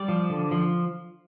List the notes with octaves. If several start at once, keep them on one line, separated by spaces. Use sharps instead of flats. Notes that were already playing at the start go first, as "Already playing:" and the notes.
Already playing: G3 D5
F3
D3
F3